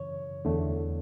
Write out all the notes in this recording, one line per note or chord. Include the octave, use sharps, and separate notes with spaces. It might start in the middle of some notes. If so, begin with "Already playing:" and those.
Already playing: F#2 C#3 E3 C#5
E2 D3 A3